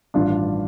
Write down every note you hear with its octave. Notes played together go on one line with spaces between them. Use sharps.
A1 G2 D#3 D4 F4